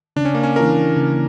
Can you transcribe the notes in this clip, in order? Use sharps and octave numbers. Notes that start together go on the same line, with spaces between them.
C#3 D4
C#4
A#3
C#4
E3 A#3 D4 A#4
C#3